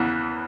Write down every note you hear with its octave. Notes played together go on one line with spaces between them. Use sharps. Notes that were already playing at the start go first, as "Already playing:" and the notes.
Already playing: E2 C#3 E3 B3